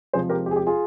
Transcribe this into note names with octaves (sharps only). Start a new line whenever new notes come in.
C3 F3 G#3 G#4 C5
G4 A#4
G4
G#4
G4
F4 G#4